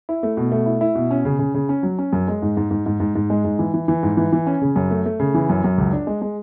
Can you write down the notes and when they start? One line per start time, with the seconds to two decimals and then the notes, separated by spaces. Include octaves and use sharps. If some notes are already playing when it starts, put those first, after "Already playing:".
0.09 E4
0.23 A3
0.37 B2
0.52 A3
0.66 E4
0.81 E4
0.95 B2
1.11 C#4
1.25 C#3
1.39 C#3
1.54 C#3
1.69 C#4
1.83 F#3
1.99 C#4
2.13 F#2
2.28 G#3
2.42 G#2
2.57 G#2
2.71 G#2
2.86 G#2
3.00 G#2
3.15 G#2
3.30 G#3
3.44 G#2
3.59 E3
3.74 E3
3.88 E3
4.03 G#2
4.17 E3
4.32 E3
4.47 C#4
4.61 C#3
4.76 F#2
4.91 A3
5.06 A3
5.20 C#3
5.34 E3
5.49 F#2
5.64 F#2
5.78 C#2
5.93 D4
6.07 G#3
6.22 G#3